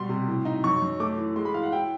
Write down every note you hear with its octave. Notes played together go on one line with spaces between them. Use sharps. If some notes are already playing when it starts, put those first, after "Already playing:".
Already playing: B2 G3 C6
C3
A2
D#4
F#2 C#6
F#2
A3 D6
E3
G#3 C6
B5
E3 F5
F#5
E4 G5